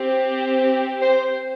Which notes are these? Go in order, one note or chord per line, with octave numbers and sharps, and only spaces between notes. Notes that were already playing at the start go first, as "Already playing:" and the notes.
Already playing: C4 G4
C5